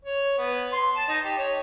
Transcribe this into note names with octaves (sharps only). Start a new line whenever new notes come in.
C#5
B3
C6
A5
D#4
G4
C#5